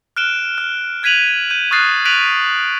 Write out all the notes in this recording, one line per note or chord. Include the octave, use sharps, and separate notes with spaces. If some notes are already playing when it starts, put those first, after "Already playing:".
F6 F#6 D7 E7 G7
F6
F#6 G#6 B6 D#7 F7 F#7
G6 D#7
C#6 D#6 F6 F#6 A6 C7
F#6 B6 D7 D#7 F7 F#7